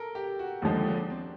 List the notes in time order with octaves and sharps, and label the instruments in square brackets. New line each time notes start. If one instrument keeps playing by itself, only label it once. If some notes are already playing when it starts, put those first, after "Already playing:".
Already playing: [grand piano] A4 A#4
G4
F#4
[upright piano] D#2 D3 F3 G#3
[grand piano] D4
C4